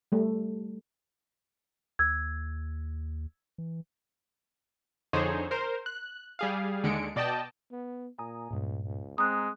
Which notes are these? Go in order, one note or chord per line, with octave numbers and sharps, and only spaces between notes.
G3 A3
D#2 E6 G#6
E3
F2 D3 D#4 G#4 C5 C#5
A#4 C5
F#6
G3 G#4 F5
D#2 D3 G#3 C#7 D7
B2 D5 D#5 G5 A5
B3
A#2 G#5 A#5 D#6
C#2 G2 A#2
C#2
G#3 C4 A#5 D#6 F#6